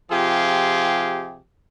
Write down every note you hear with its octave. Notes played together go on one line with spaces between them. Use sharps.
C3 F3 F4 G4 G#4